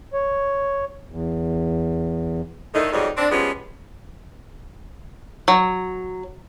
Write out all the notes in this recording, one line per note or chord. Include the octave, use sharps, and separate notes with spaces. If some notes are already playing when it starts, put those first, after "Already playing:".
C#5
E2
A2 D3 D#3 A3 D#4
F2 G#2 F#3 G3 D#4
C4 D4
F3 G3 G#3 B3 C#4
F#3